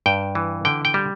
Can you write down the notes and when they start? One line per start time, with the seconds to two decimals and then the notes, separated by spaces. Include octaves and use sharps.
0.06 G2 G5
0.35 E3
0.65 D3 G5
0.85 G5
0.94 G3